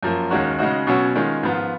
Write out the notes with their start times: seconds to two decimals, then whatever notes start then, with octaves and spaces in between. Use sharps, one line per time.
0.03 F#2 F3 A#3
0.30 D#2 D#3 G#3 C#4 F#4
0.59 C#3 G#3 D#4 F#4
0.87 B2 F#3 C#4 F#4
1.15 D#3 G#3 C#4 F4
1.43 G#2 F3 B3 F4